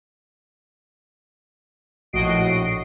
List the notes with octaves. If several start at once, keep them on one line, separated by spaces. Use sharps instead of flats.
A#1 A2 F#4 D#5 C7 D7